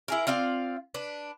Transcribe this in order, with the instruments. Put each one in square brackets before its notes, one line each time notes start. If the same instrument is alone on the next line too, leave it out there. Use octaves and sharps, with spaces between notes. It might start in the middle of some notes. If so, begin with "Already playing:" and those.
[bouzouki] E4 G#4 A#4
C4 F4 D5 F5
D4 B4